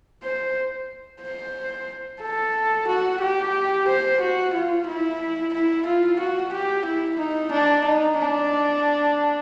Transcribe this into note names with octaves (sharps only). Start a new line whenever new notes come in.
C5
C5
A4
F#4
G4
C5
F#4
F4
E4
E4
F4
F#4
G4
E4
D#4
D4
D#4
D4